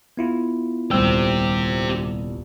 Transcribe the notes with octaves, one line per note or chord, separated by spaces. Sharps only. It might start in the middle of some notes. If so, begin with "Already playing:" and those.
B3 E4 F4
D#1 C2 C4 G4 E6